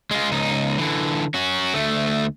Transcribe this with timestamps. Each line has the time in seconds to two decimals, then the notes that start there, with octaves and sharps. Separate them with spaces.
0.11 G#3 F4
0.32 C#2 D#4
0.78 D3 E3
1.34 C#4 F#4
1.74 D2 A3